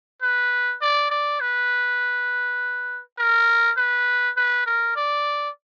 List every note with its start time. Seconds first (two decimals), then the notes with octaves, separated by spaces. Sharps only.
0.22 B4
0.81 D5
1.11 D5
1.40 B4
3.19 A#4
3.77 B4
4.36 B4
4.66 A#4
4.96 D5